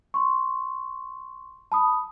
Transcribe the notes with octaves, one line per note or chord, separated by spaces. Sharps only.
C6 C#6
A5 B5 D#6